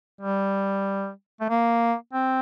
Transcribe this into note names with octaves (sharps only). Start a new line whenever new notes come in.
G3
A3
A#3
C4